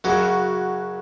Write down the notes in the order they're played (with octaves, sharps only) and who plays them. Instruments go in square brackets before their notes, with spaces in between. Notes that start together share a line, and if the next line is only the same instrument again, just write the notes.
[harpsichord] F#2 C#3 F#3 [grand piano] F#4